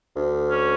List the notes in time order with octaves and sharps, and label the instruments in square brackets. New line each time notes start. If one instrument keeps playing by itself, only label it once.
[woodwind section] D2
C#4